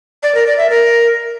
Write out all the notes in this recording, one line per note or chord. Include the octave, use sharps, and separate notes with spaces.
D5
A#4
D5
E5
A#4